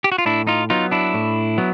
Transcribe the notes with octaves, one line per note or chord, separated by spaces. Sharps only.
G4
F#4
F4
A2 D4 E4
D#4 F4
F#3 B3 D#4 F4
D4 E4
A2
F#3 B3